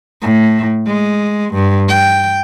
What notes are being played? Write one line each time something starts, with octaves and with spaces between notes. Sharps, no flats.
A2
G#3
G2
G5